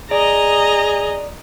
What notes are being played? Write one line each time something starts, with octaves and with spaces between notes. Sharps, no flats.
G#4 D5 D#5 A#5